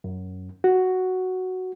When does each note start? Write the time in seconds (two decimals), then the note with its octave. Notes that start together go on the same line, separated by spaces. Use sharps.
0.04 F#2
0.64 F#4